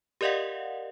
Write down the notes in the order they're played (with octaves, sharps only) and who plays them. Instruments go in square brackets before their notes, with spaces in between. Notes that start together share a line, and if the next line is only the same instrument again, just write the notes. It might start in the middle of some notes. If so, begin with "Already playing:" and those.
[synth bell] G4 A#4 D5 D#5 F5 F#5